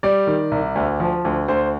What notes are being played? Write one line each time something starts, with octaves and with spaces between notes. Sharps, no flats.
G3 D5
D#3
C2
D2
F3
D2
D2 C5